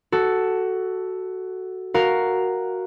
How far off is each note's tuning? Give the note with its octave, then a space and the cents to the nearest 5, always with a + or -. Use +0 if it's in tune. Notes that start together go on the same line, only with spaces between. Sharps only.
F#4 +10 A4 +0
F#4 +0 A#4 +0 F5 +0